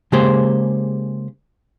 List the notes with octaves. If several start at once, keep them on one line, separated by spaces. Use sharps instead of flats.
C#3 G#3 A#3 G4 G#4 C5